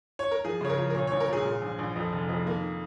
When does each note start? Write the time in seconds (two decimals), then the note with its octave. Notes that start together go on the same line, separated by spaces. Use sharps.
0.19 C#5
0.31 A#4
0.45 F3 G#4
0.61 C#3 C#5
0.70 A#4
0.78 F3
0.90 A#4
0.95 A#2 C#5
1.07 C#5
1.11 A#1
1.20 A#4
1.28 A#2 G#4
1.45 A#2
1.62 A#1
1.79 A#1
1.96 F2
2.13 F1
2.29 F2
2.46 D#3 A#3